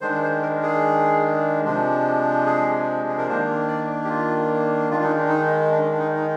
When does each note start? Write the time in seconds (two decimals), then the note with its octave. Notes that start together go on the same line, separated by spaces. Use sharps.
0.01 D#3 G#3 D4 C5
0.22 C5
0.42 A#4
0.63 G#4
1.65 C3 F3 G#3 D4
2.46 G#4
3.09 G#4
3.18 A#4
3.27 D#3 A#3 D4 C5
3.68 D5
4.05 G4
4.09 F4
4.90 D#3 G#3 D4 F4
5.03 D#4
5.16 D4
5.28 D#4
5.72 D4
5.91 D4
5.99 D#4
6.16 D#4